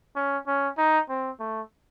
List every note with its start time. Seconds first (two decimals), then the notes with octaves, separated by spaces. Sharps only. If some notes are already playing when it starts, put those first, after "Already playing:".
0.16 C#4
0.47 C#4
0.78 D#4
1.09 C4
1.39 A3